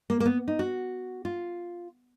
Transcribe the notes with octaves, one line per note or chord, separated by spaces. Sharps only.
A#3
A#3
B3
D#4
F#4
F4